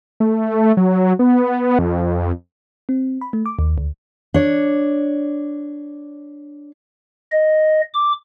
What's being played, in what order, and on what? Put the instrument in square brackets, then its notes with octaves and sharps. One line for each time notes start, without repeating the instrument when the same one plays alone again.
[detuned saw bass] A3
F#3
B3
F2
[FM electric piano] C4
B5
A3
D6
D#2
D2
[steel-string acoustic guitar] D4 C#5
[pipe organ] D#5
D6